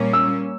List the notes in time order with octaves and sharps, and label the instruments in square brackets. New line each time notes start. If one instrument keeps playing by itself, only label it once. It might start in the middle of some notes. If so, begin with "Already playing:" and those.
Already playing: [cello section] A#2 G3 A#3 C#4
[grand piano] E6